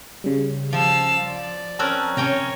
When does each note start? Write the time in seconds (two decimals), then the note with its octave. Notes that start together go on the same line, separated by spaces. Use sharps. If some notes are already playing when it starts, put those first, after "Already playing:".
0.24 C#3 G3
0.73 F3 F5 E6
1.27 D5
1.79 C4 C#4 A#4 A5 E6 F#6
2.17 C3 C#4 C#5 G5 A#5